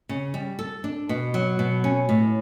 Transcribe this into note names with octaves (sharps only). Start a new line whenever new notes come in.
C#3
G3
A4
D4
B2
F#3
B2
C#4
A2